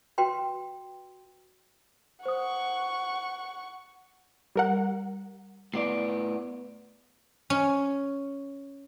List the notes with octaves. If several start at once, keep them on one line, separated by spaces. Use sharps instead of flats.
F#4 B4 G5 C6
C5 F#5 C#6 D#6
G3 A#4 F#5
A2 B3 D5 C7
C#4